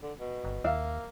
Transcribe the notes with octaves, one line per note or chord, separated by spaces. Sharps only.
D3
B2
G1
D#2 A#3 E5 F5